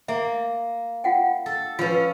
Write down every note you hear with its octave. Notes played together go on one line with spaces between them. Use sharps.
A#3 E5
F4 F#5 G5
A4
F3 C#4 F4 B4